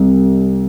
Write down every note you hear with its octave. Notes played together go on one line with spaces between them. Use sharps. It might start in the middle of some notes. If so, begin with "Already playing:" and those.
Already playing: C2